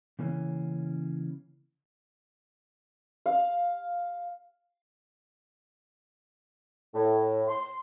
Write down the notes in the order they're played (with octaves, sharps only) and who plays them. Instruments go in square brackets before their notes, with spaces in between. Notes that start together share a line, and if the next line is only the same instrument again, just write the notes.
[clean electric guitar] C#3 E3 A#3 C#4
[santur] F5
[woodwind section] A2
C6